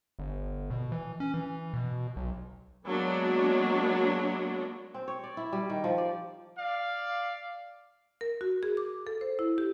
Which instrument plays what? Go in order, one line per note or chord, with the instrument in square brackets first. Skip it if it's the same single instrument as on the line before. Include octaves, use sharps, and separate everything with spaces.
[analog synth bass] G1
B2
E3
C#4
E3
B2
B1
[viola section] F#3 G#3 A#3 B3 D4 F#4
[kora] C4
C#5
D5
E4
G3
D#3
F3
D5
[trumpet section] D5 F5
[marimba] A#4
F#4
G#4
D6
A4
C5
E4
G4